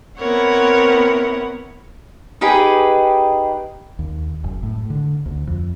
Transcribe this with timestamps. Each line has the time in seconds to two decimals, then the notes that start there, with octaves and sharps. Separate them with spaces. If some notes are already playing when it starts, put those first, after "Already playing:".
0.18 B3 C4 E4 A#4 C#5 F#5
2.41 D#4 G4 G#4 B4
3.99 D#2
4.44 F#1
4.63 A2
4.90 D3
5.26 D2
5.47 F2